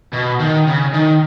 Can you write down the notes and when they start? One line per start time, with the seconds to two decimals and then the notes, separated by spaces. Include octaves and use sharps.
0.13 B2
0.39 D#3
0.67 C#3
0.93 D#3